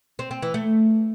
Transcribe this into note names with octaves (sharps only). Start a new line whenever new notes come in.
C4
C4
E3
A3